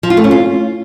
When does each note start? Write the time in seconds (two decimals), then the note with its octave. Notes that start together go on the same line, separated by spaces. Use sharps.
0.03 F3
0.10 F4
0.17 A3
0.24 C#4
0.31 F4